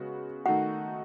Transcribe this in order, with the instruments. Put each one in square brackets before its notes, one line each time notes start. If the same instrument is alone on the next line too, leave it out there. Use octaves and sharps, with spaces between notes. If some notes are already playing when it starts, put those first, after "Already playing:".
Already playing: [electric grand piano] C#3 G#3 B3 F#4
[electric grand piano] D#3 A3 D#4 F#4 [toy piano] F#5